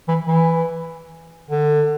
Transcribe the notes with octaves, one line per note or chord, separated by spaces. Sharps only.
E3
E3
D3